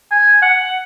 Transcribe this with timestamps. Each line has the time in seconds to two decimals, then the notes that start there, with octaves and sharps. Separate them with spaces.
0.11 G#5
0.42 F#5